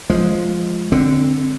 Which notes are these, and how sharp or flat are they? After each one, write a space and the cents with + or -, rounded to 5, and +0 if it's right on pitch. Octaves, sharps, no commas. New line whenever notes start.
F3 +0 G#3 +0
D3 +0 C4 +0